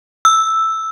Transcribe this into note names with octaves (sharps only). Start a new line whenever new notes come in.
E6